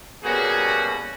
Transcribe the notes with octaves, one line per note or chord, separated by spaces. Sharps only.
B2 G3 A#3 C#4 F#4 G#4